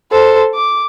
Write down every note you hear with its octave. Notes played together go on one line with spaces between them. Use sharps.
A4 C5
D6